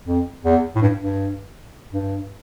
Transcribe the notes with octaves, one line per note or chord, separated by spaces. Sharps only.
F2
E2
A2
G2
G2
G2